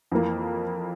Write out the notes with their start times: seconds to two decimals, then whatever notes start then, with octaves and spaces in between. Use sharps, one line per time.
0.12 F2 E3 A#3